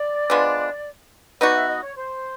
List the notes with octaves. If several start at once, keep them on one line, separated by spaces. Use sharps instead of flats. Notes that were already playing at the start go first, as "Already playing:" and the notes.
Already playing: D5
F3 G#3 B3 D4
B3 D#4 F#4 D5
E5
D#5
C#5
C5